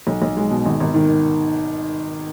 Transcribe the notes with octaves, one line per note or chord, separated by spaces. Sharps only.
B1
B1
G#3
B2
G#1
G#1
D#3